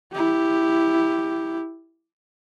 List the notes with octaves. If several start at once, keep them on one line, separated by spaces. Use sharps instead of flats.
E4 G4